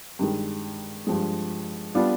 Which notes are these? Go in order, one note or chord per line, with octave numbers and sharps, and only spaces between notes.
G2 D#3 G#3
G2 F3 G#3
G3 B3 D4 F4